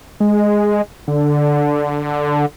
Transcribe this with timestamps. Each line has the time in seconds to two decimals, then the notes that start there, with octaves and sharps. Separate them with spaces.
0.20 G#3
1.08 D3